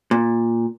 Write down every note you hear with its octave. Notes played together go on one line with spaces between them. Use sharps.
A#2